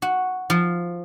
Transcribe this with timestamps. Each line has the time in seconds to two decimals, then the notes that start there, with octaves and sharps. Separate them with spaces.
0.02 F#4
0.50 F3